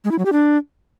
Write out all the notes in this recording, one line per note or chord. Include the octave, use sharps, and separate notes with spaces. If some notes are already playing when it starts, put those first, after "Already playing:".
G#3
E4
F#3
G4
D4